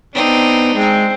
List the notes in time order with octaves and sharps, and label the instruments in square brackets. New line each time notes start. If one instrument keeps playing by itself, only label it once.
[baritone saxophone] B3 [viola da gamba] C4 D4 [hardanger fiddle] D#4
[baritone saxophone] G#3 [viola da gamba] C4